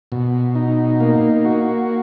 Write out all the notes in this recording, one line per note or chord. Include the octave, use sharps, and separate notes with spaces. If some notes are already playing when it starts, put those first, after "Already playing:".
B2
D#4
A#3
F#4